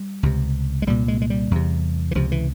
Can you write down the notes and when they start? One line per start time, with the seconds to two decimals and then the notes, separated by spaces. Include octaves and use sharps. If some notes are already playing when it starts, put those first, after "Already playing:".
Already playing: G3
0.23 C#2 C3
0.82 G#3
0.87 C2 A#2 G3
1.08 G#3
1.22 G#3
1.30 G3
1.51 E2 C3
2.11 E3
2.15 C#2 C3 F3
2.32 E3